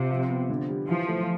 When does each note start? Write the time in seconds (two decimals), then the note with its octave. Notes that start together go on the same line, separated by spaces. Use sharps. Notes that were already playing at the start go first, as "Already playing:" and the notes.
Already playing: C3 F4
0.10 F3
0.29 B3
0.50 D3
0.68 G3
0.88 E3 F3
1.08 A3